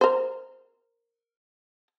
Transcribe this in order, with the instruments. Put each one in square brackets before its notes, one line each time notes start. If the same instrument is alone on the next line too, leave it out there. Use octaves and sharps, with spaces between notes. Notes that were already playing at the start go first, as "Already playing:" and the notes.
[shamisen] A#4 C5